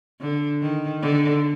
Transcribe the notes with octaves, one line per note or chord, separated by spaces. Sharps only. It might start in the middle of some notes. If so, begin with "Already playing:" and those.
D3
D#3
D3